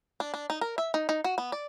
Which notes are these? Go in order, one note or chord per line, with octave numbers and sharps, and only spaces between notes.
D4
D4
D#4
A#4
E5
D#4
D#4
F#4
B3
D5